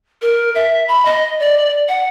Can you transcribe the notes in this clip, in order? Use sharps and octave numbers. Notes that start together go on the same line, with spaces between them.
A#4
E5
B5
D#5
D5
F#5